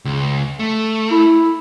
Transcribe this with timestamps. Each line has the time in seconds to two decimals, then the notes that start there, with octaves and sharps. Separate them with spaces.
0.05 C#2
0.59 A3
1.11 E4